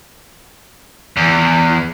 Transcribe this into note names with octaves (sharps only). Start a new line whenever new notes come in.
E2